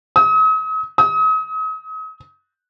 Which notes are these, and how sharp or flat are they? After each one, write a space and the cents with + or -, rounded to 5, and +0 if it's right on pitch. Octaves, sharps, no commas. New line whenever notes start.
D#6 +45
D#6 +40